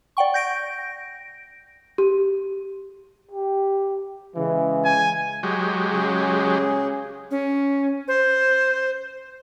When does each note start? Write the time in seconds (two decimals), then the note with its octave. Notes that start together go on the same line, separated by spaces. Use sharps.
0.17 D5 F#5 G5 C#6
0.34 G6 A#6 D7
1.98 G4
3.31 G4
4.36 C#3 E3 G#3
4.85 G#5
5.43 F#3 G#3 G4
5.90 C#3 G#4
7.31 C#4
8.08 C5